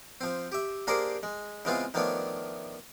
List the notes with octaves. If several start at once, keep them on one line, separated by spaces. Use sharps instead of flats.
F3 C4
G4 E5
A#3 D4 G4 G#4 A#4 C5
G#3
C#3 E3 G#3 B3 C4 F4
D#3 F3 A3 B3 D4 C#5